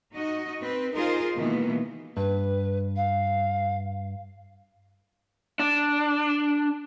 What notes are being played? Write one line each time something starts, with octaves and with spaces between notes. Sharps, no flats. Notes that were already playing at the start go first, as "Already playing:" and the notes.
D#4 F#4 D#5
C4 B4
D#4 F4 G#4 A#4 C5
B2 D#3 E3 G#3 A#3 B3
G2 B4
F5
D4